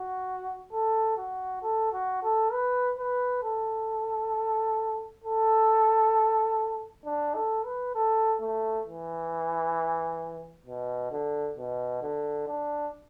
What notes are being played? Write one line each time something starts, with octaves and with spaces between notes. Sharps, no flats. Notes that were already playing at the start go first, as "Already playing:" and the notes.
Already playing: F#4
A4
F#4
A4
F#4
A4
B4
B4
A4
A4
D4
A4
B4
A4
A3
E3
B2
D3
B2
D3
D4